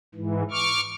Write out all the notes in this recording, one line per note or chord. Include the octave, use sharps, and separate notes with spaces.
G#2 E3
C#6 D6 F6